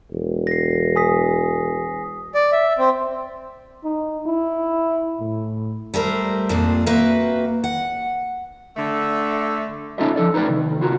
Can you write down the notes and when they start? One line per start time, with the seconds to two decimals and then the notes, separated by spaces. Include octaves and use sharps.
0.12 E1
0.47 A#6 C7
0.96 G#5 D#6 B6
2.35 D5
2.52 E5
2.78 C4
3.84 D#4
4.26 E4
5.20 A2
5.94 G3 A3 A#4 C5
6.49 F2 A#2 A#3 C4 D4
6.86 A#3 C4 F#4 B4 E5
7.64 F#5
8.77 D3 A3
9.98 C#4 D#4 F4 A4 D#5 E5
10.16 F3 A4 D5
10.34 D#4 B4 C#5 D5 G5
10.47 C2 D#3
10.80 C2 F4 F#4 A#4